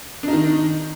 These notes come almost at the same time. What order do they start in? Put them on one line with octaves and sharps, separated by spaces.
D4 D#4 D#3